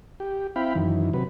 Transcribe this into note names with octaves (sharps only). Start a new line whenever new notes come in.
G4
C4 E4 F5 G5 B5
F#2 D#3 E3
C3 F#3 B4